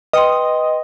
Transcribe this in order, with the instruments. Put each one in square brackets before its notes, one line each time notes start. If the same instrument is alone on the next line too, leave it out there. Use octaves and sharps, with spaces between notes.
[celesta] B4 G5 C6 [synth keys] D#5